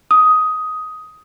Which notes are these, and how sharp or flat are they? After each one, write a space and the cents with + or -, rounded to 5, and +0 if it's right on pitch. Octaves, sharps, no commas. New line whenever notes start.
D#6 +10